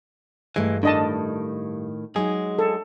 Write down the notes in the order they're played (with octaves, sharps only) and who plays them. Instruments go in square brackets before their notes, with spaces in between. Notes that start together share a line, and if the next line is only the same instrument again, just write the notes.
[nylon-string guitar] G2 A3 [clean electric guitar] E3 G#3
[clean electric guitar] A2 D#3 [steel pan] D4 D#5 A5
[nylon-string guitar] F#3 D#4 [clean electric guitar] G#3 G#4
[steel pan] A4